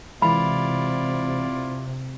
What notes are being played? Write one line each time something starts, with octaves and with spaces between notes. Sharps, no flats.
C3 E3 G#3 E4 F4 D5 B5